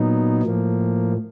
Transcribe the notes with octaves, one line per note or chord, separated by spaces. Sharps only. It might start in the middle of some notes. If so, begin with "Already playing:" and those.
Already playing: A#2 F#3 B3 D#4
A2 F3 A#3